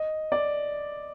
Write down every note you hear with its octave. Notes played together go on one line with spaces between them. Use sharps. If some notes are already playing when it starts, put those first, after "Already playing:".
Already playing: D#5
D5